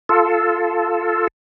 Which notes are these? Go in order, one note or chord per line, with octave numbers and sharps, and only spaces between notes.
F4 A4